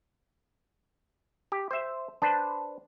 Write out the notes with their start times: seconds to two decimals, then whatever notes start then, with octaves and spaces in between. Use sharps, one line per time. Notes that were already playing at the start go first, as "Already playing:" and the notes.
1.52 G4
1.71 C5 E5
2.22 D4 B4 C5 A5